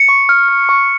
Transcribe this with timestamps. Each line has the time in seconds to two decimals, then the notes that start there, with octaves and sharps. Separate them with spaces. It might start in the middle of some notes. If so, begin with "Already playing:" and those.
Already playing: C#7
0.09 C#6
0.29 F6
0.48 F6
0.69 C#6